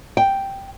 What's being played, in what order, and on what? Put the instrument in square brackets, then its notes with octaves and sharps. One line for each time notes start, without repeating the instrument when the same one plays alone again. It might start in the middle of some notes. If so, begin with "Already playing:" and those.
[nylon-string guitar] G5